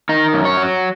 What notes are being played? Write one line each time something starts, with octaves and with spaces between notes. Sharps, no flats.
D#3 D#4
F#2
C#5
F#3